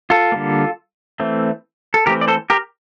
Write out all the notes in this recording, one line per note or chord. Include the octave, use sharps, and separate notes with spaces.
F4 A4
D3 G3 A#3
E3 A3 C4
A4
E3 A3 C4 G4 A#4
D5
A4 C5
G4 A#4